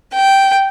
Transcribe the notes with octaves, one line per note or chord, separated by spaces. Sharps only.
G5